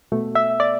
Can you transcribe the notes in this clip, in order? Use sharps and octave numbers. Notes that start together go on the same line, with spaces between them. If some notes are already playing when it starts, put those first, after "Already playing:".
B2 A3
E5
D5